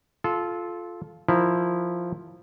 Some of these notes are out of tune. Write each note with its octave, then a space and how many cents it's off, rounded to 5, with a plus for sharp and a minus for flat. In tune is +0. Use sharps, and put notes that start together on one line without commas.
F4 +0 A4 -20
F3 +0 E4 +0 A#4 +0